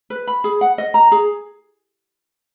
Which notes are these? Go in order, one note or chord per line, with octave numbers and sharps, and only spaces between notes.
B4
B5
G#4
F#5
D#5
A#5
G#4